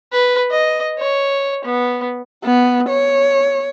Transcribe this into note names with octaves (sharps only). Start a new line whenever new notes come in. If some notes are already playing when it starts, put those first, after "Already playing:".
B4
D#5
C#5
B3
B3
C#5